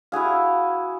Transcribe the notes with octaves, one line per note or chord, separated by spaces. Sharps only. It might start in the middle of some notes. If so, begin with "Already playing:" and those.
E4 F#4 G#4 F5